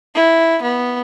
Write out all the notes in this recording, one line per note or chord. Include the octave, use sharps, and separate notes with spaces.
E4
B3